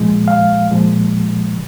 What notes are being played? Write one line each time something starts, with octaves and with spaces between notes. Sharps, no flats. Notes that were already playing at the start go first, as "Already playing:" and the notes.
Already playing: A#2 F3 G#3
F5
A#2 F3 G#3